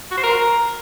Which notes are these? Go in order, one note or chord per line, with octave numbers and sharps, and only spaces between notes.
F#4
C5
A#4